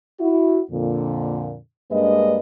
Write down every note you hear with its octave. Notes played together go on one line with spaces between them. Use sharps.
E4 F#4
F2 A#2 D3
G2 G#3 A#3 D4 B4 D#5